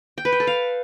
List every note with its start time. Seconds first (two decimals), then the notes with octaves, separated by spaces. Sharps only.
0.18 G5
0.25 B4
0.32 G5
0.40 A4
0.47 F5